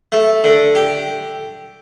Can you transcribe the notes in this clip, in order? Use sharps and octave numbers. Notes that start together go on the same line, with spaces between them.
A3
D3
G4